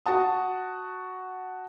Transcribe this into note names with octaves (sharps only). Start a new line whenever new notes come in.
F#4 F#5 A5 D#6